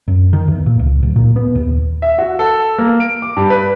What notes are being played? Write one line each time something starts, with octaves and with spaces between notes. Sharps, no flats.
F#2
D#3
E2
A#2
C#2
D1
A#2
B3
D#2
E5
F#4
A4
A#3
D7
D6
G2
B4